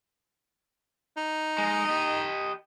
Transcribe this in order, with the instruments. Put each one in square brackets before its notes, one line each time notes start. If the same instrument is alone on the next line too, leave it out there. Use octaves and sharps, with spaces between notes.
[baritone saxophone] D#4
[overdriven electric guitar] G#3
G4 D#5